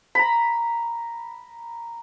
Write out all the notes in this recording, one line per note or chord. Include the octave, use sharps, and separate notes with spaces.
A#5 B5